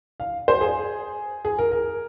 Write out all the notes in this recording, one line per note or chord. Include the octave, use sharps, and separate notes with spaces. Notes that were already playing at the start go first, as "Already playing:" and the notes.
F5
C5
G#4
G#4
A#4
A#4